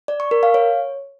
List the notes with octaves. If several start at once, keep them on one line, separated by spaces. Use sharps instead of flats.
D5
C#6
A#4
F5
C#5